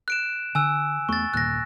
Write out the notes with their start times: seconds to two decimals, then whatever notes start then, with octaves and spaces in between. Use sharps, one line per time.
0.08 F#6 D7 E7
0.55 D3 G#5 E6 F#6
1.09 E2 A3 B3 C#6 A6
1.34 G1 D#2 A#2 F#6 A#6